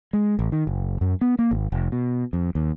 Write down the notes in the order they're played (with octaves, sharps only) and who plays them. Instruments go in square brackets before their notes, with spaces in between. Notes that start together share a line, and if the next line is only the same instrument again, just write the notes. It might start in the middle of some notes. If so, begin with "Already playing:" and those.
[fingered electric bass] G#3
A1
D#3
F#1
F#2
B3
A#3
G#1
F1
B2
F2
D#2